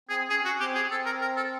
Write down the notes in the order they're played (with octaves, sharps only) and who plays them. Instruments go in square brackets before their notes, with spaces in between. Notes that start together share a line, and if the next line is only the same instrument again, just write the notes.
[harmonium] C4 [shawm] G#4
[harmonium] C#4 [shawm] G#4
[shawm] F#4
[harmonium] C4 [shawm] G4
[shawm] G#4
[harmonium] C4 [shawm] A4
[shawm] A#4
A#4
A4